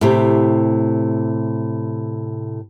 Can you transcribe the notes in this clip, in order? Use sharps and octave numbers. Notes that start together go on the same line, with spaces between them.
A2 C3 G4